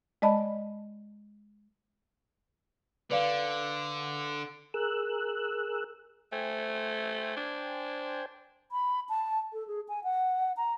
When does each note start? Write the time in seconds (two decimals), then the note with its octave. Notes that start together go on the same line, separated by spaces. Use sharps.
0.22 G#3 D5 D#5 A5 B5
3.11 D3 B4 D5 F5
4.74 G#4 A#4 E6 F#6
6.32 A3 C5 G5 G#5
7.36 D4
8.72 B5
9.09 A5
9.53 A4
9.67 G#4
9.89 G#5
10.04 F#5
10.57 A#5